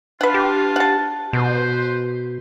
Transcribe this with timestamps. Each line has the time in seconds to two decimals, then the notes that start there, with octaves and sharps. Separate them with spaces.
0.21 D4 F4 B4 F#5
0.34 G4
0.76 F#5 A5
1.33 B2 B4 C5